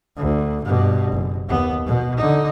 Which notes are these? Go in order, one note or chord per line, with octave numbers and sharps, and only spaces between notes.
D2
G2 B2
F#1
D#2 B3
B2
D3 D#4